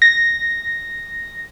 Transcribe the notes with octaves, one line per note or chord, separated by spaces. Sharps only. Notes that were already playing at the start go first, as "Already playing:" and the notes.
A#6